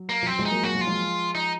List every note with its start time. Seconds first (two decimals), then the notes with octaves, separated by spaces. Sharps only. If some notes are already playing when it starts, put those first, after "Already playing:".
Already playing: F#3
0.09 A#3
0.23 F3
0.27 F#3 C4
0.39 F3 G#3
0.45 D#4
0.51 F#3 A#3
0.63 F#3 A#3 F#4
0.75 F#3 A#3
0.81 F4
0.87 F3 G#3
1.35 D#4